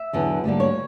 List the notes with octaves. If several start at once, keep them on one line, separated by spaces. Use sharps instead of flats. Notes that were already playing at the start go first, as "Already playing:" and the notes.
Already playing: E5
E2 D3 F#3 B3
D2 D3 G3 A#3 D4
C#5